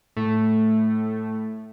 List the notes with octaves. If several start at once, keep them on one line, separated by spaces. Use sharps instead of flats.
A2 A3